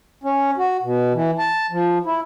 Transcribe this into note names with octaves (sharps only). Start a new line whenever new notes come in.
C#4
F#4
B2
E3
A5
F3
E4